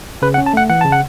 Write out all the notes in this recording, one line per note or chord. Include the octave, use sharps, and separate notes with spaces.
C#3 B4
F#5
C#4
A5
A3 F#5
E3 F#5
C#3 A5
F#5